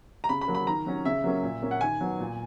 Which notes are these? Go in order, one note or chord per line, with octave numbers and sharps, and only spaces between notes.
A#5
C#3 B5
B5
F#3 A#3
B5
D#3 A#5
F#3 C#4
C#3 E5
F#3 A#3 C#4
A#2
A#3 C#4
F#5
D#3 G#5
F#3 B3
A#2